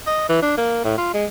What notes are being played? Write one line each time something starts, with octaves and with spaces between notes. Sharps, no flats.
D#5
E3
D4
A#3
A2
F4
G#3